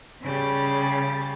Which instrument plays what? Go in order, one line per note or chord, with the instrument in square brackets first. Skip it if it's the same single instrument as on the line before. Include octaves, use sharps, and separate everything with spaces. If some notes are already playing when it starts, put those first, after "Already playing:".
[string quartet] C#3 G3 A6